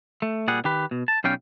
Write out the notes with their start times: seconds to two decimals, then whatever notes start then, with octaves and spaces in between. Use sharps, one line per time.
0.22 A3
0.48 A#2 G3 G#4 F#5
0.64 D#3 G4 B4
0.91 B2
1.08 A5
1.24 B1 G3 C#4 F5 G5